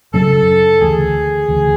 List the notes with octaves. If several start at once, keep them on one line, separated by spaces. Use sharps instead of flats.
F#2 C#3 F#3 C#4 A4
D2 C#3 E3 G#4
D2 C#3 E3